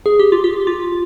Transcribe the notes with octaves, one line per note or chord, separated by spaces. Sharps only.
G#4
G4
F4
G4
F4